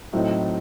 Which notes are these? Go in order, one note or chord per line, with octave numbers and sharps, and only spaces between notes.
A2 F#3 A3 C4 D#4